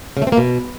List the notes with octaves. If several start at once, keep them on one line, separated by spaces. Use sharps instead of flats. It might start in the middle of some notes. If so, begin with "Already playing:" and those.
C#3
A3
C4
A#3
B2